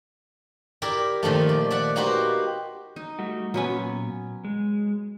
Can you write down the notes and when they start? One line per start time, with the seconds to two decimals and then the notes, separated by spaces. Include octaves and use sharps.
0.82 E4 G4 A#4 D5 E5
1.23 A#2 D#3 F3 A3
1.49 D5
1.70 D5 E5 F#5
1.96 A#3 D#4 F#4 G4 B4 C5
2.96 D#4
3.19 G3 A3 F#4
3.54 A#2 F#3 B3 C#4
4.45 G#3